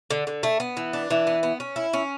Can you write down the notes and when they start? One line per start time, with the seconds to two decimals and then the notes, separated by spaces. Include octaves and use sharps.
0.11 D3
0.27 D3
0.43 A3
0.60 B3
0.77 E3
0.93 D4
1.10 E3
1.27 B3
1.43 B3
1.60 C#4
1.76 E4
1.93 C#4